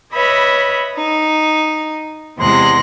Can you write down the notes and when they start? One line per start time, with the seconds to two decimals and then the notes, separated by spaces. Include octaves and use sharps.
0.13 B4 C#5 D#5 E5 B5
0.95 D#4
2.37 E2 C3 G#3 C6 F#6 A#6